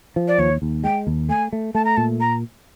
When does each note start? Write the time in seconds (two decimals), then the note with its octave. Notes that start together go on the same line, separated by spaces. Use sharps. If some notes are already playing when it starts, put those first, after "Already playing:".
0.16 F3
0.28 D5
0.38 D#2 C#5
0.62 D#2
0.83 G#3 G5
1.07 D#2
1.29 A3 G#5
1.53 A3
1.75 A3 A5
1.85 A#5
1.97 A#2 A5
2.20 A#5